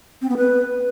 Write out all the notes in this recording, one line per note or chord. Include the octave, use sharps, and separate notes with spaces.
C4
B3
B4